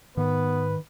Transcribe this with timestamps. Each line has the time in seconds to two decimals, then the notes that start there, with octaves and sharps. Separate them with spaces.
0.17 G#2 D#3 B3 B4